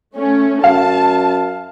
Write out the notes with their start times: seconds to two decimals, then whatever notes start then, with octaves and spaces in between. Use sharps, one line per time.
0.15 A3 C#4
0.64 F#2 F5 A5